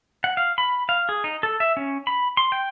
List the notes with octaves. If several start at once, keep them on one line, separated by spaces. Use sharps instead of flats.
F#5
F5
B5
F5
G#4
D#4
A4
E5
C#4
B5
C6
G5